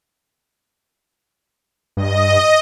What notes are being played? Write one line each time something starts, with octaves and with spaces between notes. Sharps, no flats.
G2 D#5